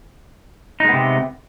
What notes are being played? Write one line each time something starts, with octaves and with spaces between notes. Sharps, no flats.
C3 G#3 B3 D#4